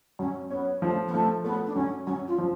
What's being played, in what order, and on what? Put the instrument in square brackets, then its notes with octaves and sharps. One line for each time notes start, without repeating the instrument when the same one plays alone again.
[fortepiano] F#2 [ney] C#4
[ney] B3 [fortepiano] C#4
[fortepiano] F3 [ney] A3
[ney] B3
[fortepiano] F3 [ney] A3
[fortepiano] A3 [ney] B3
[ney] D4
[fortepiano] F#2 [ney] C#4
[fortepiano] F#2 [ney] C#4
[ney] F4
[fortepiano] F3